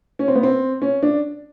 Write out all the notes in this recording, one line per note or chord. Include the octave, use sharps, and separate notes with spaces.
C#4
C4
B3
C4
C#4
D4